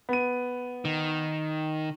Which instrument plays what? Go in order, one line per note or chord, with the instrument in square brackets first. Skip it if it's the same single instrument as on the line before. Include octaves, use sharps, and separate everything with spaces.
[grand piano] B3 D#7
[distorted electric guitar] D#3